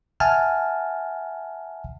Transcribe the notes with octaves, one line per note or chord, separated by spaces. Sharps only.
E5 F#5 G#5 A5 F6